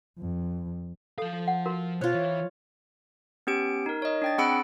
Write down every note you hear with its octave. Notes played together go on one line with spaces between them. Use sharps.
F2
F3 A4 F5
F#5
F#4 A#4
B2 F4 C5 C#5
E3
B3 C#4 G4 D7
D#4 A#4
C#5 D#5
D4 G5 A6
C4 G#4 F#5 B5 E6 D7